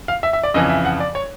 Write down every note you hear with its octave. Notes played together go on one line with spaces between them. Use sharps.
F5
E5
E5
D5
F2 C#3 E3 D#5
E5
F#5
D5
C#5